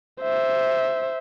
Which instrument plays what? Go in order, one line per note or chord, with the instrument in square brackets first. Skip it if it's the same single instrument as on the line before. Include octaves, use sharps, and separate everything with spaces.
[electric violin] C5 E5